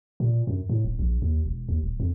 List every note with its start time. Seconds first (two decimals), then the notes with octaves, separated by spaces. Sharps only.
0.20 A#2
0.47 F#2
0.69 A2
0.85 D#1
0.99 A#1
1.22 D#2
1.46 E1
1.69 D#2
1.83 D#1
2.00 F2